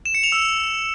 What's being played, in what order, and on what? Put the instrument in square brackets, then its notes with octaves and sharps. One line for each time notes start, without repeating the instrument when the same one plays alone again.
[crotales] E7
C#7
F7
E6